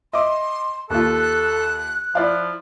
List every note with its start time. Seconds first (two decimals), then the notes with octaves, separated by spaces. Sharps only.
0.13 D#5 E5 C6 D6
0.90 D#2 F4 A4 F#6
2.15 F3 E4 D5 F5